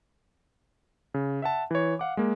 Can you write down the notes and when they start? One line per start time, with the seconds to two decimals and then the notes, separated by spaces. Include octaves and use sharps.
1.14 C#3
1.42 E5 F#5 A5
1.71 E3 C#5
1.99 F5 F#5 D6
2.17 G#3 A#3